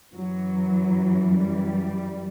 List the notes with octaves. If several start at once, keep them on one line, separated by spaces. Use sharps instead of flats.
F#2 E3 F#3
G3